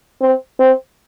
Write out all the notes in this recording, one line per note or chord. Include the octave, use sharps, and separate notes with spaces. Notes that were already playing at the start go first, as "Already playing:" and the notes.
C4
C4